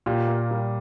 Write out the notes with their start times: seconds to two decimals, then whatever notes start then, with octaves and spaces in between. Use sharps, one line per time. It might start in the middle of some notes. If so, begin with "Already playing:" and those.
0.06 A#2 G4
0.28 A#3
0.51 G3